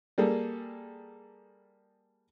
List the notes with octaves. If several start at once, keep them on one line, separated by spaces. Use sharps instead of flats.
G3 A#3 G#4 A4